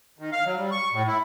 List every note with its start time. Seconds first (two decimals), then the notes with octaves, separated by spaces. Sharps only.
0.19 D#3
0.32 F5
0.45 F#3
0.57 G3
0.71 C#6
0.93 A2
1.07 E4